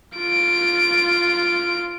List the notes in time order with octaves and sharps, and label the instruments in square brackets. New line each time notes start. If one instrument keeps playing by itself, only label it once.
[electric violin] F4 D7